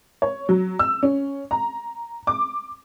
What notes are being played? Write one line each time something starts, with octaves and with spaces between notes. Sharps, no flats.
C#5
F#3
E6
C#4
A#5
D6